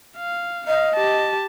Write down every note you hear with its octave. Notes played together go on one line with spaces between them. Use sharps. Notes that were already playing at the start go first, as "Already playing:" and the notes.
F5
D#5 F5
G4 A5